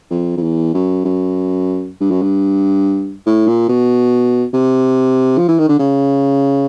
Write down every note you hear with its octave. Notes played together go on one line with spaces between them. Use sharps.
F2
F2
E2
F#2
F#2
G2
F#2
G2
A2
A#2
B2
C3
F3
E3
D#3
D3
C#3